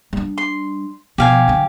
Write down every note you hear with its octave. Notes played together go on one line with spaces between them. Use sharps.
G3 D4
C6
B2 F3 G4 F5 G#5
D3 F#3